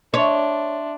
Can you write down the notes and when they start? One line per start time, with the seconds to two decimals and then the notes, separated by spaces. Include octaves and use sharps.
0.14 D4 C#5 E5 C6